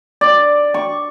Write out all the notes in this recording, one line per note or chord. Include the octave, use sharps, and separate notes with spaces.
D5
C#6